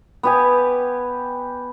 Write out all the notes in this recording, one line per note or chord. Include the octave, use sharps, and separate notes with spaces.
B3 G4 G#5